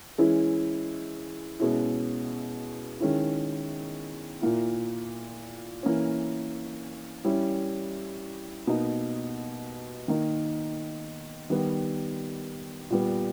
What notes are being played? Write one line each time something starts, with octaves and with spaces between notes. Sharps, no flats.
E3 G#3 C#4 E4
B2 G#3 C#4 E4
D#3 G#3 C#4 E4
A#2 A#3 E4
E3 A#3 C#4
G3 C#4 E4
B2 A#3 D#4
D#3 A#3 D#4
D#3 G3 B3
A#2 G3 B3